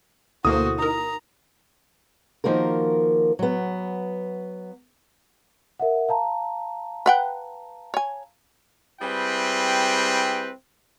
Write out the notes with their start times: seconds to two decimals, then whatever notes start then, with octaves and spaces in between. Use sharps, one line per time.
0.45 D2 B2 A#3 E4 F#4 A4 C5 D#6
0.79 D#4 A#4 A#5
2.44 D#3 F3 A#3 F#4 A#4
3.39 F#3 B3
5.80 A#4 E5 F#5
6.09 F5 A5 A#5
7.06 B4 F#5 G5
7.94 C#5 G#5
9.00 G3 C4 E4 G#4 B4 G5